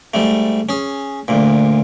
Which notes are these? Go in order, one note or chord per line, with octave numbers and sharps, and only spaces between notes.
G#2 G3 A3
C#4 G#4
D2 A#2